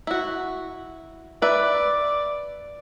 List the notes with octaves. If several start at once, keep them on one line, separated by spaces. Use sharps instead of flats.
E4 F#4
B4 D5 E5